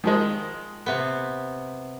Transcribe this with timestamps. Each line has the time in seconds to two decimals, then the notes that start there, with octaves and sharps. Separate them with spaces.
0.04 D#3 F3 G#3
0.86 C3 B3